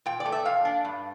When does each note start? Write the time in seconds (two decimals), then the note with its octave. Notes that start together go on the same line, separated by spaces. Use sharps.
0.06 A#2 G5
0.20 D5
0.26 A3
0.32 E5
0.45 A#2 F5
0.65 D4
0.85 G2